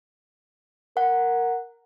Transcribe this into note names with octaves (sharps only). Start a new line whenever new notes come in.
A#4 F#5